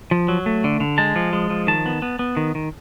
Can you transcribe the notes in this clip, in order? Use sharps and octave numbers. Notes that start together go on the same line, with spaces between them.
F3
F#3
A3
D3
D3
G#3 A5
F3
G#3
F3
D#3 A5
B3
B3
B3
D#3
D#3